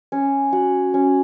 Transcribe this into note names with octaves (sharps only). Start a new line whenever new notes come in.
C#4
F#4
C#4